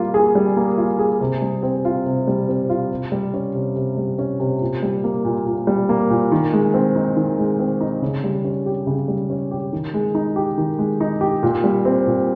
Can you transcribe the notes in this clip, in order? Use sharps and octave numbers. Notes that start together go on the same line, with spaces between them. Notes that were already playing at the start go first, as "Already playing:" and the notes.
Already playing: G3 A#3 F4
G#4
G3
A#3
F4
G#4
C3
G3
C4
F4
C3
G3
C4
F4
C3
G3
C#4
C3
C3
G3
C#4
C3
A#2
G3
A#3
A#2
A#2
G3
A#3
A#2
D#3
G#3
C4
D#4
D#3
G#3
C4
D#4
C#3
G3
C#4
G4
C#3
G3
C#4
G4
D#3
G#3
D#4
G4
D#3
G#3
D#4
G4
A#2
G3
C4
A#2